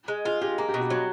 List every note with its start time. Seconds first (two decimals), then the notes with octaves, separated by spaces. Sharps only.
0.08 G#3
0.25 F4 G#4
0.42 G#3 G4
0.58 A#3 G#4
0.69 G4
0.74 B2
0.80 F#4
0.90 F#3 F#4